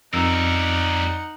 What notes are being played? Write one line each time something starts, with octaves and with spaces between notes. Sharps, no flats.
F2 G3 D#4 A#4 F#5 E6